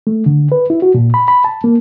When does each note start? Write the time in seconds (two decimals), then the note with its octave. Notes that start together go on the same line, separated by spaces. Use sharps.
0.07 A3
0.26 D3
0.52 B4
0.70 E4
0.82 F#4
0.94 A#2
1.14 B5
1.28 B5
1.44 A5
1.64 A#3